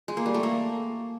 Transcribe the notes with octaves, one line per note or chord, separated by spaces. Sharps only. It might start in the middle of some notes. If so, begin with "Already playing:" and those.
G#3
A#3
G3
A3
A#3